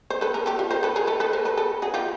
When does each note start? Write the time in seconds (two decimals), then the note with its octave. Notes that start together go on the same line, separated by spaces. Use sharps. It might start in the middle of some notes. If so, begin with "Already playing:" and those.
0.10 C5
0.21 A4 B4
0.34 G#4 A#4
0.46 G4 A4
0.59 F4 G4
0.71 A#4 C5
0.83 A4 B4
0.96 G#4 A#4
1.07 A4 B4
1.20 A4 B4
1.33 A#4 C5
1.45 A4 B4
1.57 A4 B4
1.82 F#4 G#4
1.94 F4 G4